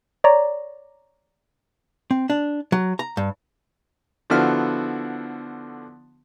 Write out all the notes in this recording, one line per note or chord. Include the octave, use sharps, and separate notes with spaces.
C#5 D5 A#5
C4
D4
F#3
A#5
G2
D3 F3 B3 E4 F#4 F6